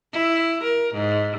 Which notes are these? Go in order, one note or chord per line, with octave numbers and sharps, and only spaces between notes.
E4
A#4
G#2